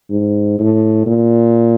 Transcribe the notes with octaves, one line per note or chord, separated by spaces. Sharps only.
G#2
A2
A#2